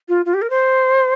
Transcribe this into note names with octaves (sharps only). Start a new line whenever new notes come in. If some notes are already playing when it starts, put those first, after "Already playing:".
F4
F4
G4
A#4
C5